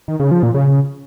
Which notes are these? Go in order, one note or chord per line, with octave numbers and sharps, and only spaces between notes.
D#3
C#3
F3
A#2
C#3